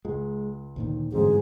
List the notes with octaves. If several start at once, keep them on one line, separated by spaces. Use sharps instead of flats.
C#2 G#3
D2 A#2 D#3
G1 G#2 D3 E3 F#3 C4 G#4